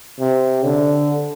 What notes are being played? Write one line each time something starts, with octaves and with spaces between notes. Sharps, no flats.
C3
D3